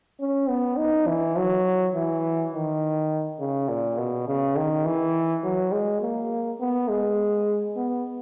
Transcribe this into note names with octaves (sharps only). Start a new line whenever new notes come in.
C#4
B3
D#4
E3
F#3
E3
D#3
C#3
A#2
B2
C#3
D#3
E3
F#3
G#3
A#3
B3
G#3
B3